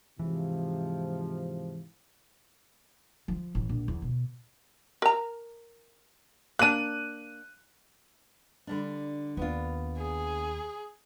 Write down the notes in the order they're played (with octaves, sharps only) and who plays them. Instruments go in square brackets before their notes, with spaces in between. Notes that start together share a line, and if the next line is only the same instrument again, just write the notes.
[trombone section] G#2 C3 F3 [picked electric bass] E3
[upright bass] F3
A1
A#1
E2
B2
[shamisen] A#4 A#5
[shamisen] A#3 D4 [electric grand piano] F#6 D#7
[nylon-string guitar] D3 G3 D4
[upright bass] D#2 [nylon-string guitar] B3 D4 F4
[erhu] G#4